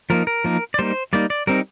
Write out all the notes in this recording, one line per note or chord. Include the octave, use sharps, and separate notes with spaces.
F3 A#3 D#4 A#4
A#4
F3 A#3 D#4
D5
G3 A#3 D#4 C5
G3 A#3 D#4 D5
D5
G3 C4 D#4 A#4